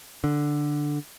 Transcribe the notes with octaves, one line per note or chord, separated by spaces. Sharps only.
D3